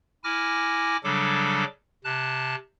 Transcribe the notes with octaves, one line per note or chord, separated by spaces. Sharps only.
E4 G#5 D6 F6 A#6
C#3 F#3 G3 D4 A4 D6
C3 A5 F#6